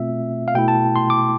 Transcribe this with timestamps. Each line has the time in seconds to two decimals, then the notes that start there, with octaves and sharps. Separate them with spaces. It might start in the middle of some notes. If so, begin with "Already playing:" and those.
Already playing: B2 A3 C4 F4 E5
0.48 F5
0.55 B2 A3 E4 G5
0.68 A5
0.96 C6
1.10 D6